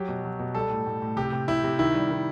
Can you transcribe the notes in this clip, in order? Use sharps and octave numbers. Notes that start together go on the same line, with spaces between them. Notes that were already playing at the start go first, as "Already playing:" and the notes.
Already playing: F#3 G4
B2
F#3
B2
G3 A4
A2
A2
A2
C3 G4
C3
C3 E4
C3
D#3 E4
G3
D#3